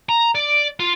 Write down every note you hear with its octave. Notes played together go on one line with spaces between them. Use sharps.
A#5
D5
F4